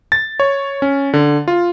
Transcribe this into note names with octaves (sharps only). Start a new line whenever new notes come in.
A6
C#5
C#4
D3
F4